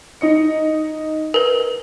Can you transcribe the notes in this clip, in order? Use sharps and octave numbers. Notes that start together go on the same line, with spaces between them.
D#4 D#5 C#7
A#4 B4